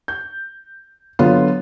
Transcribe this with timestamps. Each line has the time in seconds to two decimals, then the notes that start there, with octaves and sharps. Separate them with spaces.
0.08 G6
1.19 D3 F#3 B3 F4